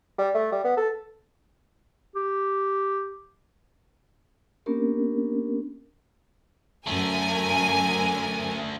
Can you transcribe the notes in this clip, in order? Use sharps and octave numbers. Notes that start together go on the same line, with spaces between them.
G3
A3
G3
B3
A4
G4
A#3 B3 C#4 D4 G4 A#4
F#2 D3 A3 A#4 G#5